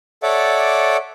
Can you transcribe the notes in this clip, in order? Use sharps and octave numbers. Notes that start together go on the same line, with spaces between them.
A4 C#5 D5 E5 F#5 D6